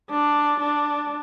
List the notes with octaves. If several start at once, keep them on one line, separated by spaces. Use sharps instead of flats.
D4
D4